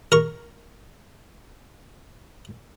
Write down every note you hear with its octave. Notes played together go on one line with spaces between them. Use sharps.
A#4 C#6